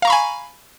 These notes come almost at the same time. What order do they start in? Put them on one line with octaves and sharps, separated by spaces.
F5 A#5 C#6 B5 G#5